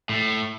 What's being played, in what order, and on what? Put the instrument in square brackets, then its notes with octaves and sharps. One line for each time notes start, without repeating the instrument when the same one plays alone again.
[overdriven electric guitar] A2